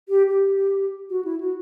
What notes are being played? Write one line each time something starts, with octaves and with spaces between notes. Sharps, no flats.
G4
G4
F#4
E4
F#4